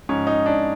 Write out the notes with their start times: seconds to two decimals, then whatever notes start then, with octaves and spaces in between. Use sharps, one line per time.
0.09 G#2 F3 C#4
0.27 D#4
0.46 D4